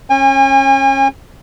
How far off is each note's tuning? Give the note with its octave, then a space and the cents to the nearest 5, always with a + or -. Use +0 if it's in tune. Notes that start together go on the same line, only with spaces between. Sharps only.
C#4 -30 G#5 -40